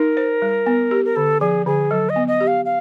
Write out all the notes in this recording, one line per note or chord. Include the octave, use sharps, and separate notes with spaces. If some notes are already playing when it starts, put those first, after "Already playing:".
Already playing: D#4 A#4
C5
G3
B3
G4
A#4
D3 A4
F3 G#4
D3 G#4
F#3 A4
D#5
B3
D#5
G4
F5
F5